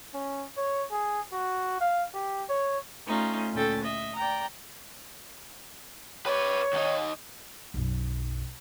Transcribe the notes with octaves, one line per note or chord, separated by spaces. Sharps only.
C#4
C#5
G#4
F#4
F5
G4
C#5
A3 C#4 D#4 F4
D2 A#2 C#4 A4 G5 A6
D#5 E5
D5 G5 A#5
B4 C#5 D5
D#2 D#4
B1 F#2